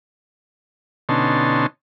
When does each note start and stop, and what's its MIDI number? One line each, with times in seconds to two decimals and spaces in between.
1.09 1.66 47
1.09 1.66 50
1.09 1.66 61
1.09 1.66 63
1.09 1.66 81
1.09 1.66 84